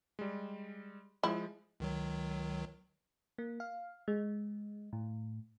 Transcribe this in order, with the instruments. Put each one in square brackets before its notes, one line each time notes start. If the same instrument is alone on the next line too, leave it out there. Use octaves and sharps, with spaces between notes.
[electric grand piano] G3 G#3
[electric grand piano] F3 G#3 [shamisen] E4
[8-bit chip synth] C#2 D#3 F#3
[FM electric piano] A#3
F5
G#3
A2